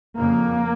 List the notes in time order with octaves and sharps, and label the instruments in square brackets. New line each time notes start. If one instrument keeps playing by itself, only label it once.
[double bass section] F2 C#3 A#3